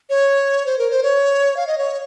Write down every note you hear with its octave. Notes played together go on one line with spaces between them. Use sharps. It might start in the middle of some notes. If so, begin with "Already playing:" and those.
C#5
C5
A#4
C5
C#5
F5
D#5
C#5